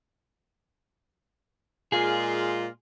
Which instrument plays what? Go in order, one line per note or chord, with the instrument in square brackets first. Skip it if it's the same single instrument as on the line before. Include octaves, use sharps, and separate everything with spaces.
[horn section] A#2 G#3 F4 [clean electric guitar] G#4